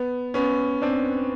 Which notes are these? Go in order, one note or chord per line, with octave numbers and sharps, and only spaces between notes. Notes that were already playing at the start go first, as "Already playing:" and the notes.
Already playing: B3
B3 C#4
C4 D4